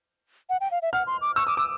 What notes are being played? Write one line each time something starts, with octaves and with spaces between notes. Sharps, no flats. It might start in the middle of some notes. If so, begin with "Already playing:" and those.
F#5
G5
F5
E5
F#5 F6
C6
D6
C#6 E6
D6 D#6
D6 E6